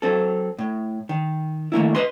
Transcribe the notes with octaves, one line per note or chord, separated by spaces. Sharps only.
F#3 C4 A4
A2
D#3
D#3 A3 A#3 E4
B4 D#5 C6